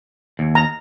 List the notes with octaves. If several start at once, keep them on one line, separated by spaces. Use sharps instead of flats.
D#2
A#5